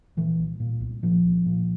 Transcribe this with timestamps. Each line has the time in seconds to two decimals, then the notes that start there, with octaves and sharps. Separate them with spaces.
0.17 A#2 E3
0.39 C2
0.60 A#2
0.81 C2
1.03 A#2 F3
1.24 C2
1.46 A#2